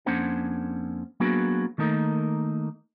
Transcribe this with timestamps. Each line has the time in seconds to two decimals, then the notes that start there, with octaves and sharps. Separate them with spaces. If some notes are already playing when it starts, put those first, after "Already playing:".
0.06 F2 A#3 C#4 D4 C5 F#5
1.20 F#3 A#3 B3 D4 F#4 G#4
1.78 D#3 A3 A#3 D#4